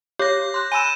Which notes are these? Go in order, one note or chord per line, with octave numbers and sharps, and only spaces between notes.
G4 C#5 D6 G6 A#6
C6 F#6
G#5 B5 E6 D#7 E7